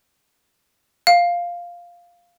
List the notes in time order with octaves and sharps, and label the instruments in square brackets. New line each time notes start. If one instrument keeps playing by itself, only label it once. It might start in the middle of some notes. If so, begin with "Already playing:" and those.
[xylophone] F5